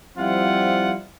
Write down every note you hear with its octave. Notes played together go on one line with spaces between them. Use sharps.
F3 G3 C4 E4 F4 F#5